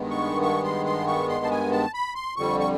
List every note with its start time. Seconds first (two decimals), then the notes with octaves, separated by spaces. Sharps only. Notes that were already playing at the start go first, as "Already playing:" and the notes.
Already playing: G2 D#3 G#3 B3
0.11 C#6
0.42 C#6
0.64 C6
0.86 C6
1.07 C#6
1.29 C6
1.45 A5
1.51 G#5
1.72 A5
1.94 B5
2.15 C6
2.36 F2 D3 G3 C#6
2.60 C#6